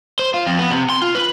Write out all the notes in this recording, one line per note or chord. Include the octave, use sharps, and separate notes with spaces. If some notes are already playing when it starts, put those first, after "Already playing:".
C5
F4
F2
B3
C3
C6
F4
B4